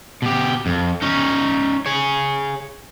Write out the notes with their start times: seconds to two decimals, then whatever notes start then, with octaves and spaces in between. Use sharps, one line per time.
0.22 B2 G4
0.66 F2
1.02 C#4 D#4
1.86 G#4 C#5